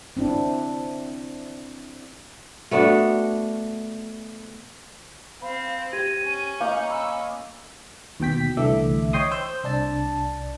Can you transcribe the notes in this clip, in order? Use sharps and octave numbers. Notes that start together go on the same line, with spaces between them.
C4 D4 E4
A3 B3 D4 F#4
C4 F5 B5
G4 G5 G#6 A#6 D#7
C#4
A#3 D#5 F5 A#5 G6
B5 E6
D#2 B2 G5 B6
C2 D3 E3 A3 E5 D6
C#5 D#5 G5 C6 D#6
C5 E6 G6
C2 D4 A5